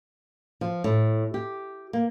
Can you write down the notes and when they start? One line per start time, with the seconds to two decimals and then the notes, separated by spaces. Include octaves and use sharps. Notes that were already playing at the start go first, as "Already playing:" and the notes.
0.61 F3
0.84 A2
1.34 G4
1.93 A#3